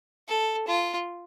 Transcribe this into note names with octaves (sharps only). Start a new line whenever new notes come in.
A4
F4